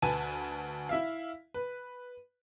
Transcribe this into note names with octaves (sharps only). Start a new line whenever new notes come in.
D2 B4 G#5 A5 D#7
E4 E5 F5
B4